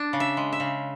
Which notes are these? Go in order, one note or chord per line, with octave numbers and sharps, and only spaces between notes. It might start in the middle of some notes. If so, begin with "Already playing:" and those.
Already playing: D4
C#3
E5
G#3
E5
C#3